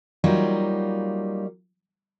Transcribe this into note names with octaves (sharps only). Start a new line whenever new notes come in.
F#3 G3 A#3 D#4 F4